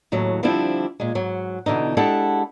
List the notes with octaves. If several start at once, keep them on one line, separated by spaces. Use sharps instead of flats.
D#2 A2 F#3
D3 F3 G3 C4 D4 E4
A#2 G#3
G#2 F#3
B2 D3 E3 D#4
G#3 D4 E4 G4 A4 F#5